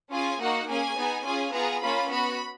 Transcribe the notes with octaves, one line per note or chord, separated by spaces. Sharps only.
C#4 F4 G#4 G#5
A#3 D#4 F#4 F#5
A#3 C#4 G#4 G#5
B3 D#4 G#4
C#4 F4 G#4 G#5
B3 F4 G#4 A#5
A#3 C#4 F4 B5
B3 F#4 B5